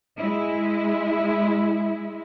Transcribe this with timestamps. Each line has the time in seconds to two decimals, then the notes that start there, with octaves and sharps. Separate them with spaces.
0.19 G#3 E4